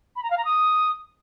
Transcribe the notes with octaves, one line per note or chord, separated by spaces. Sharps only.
B5
A#5
F5
A#5
D#6